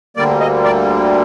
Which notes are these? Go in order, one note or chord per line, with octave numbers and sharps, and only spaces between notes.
D2 D3 G3 A#3 D5
D#5
D5